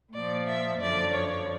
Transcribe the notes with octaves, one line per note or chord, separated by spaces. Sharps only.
A#2 F3 D5
E5
F#2 D3 F3 D5
C#5